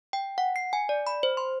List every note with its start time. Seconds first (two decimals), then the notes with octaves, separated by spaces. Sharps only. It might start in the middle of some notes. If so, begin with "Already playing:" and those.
0.13 G5
0.38 F#5
0.56 C7
0.73 G#5
0.89 D5
1.07 B5
1.23 C5
1.37 C6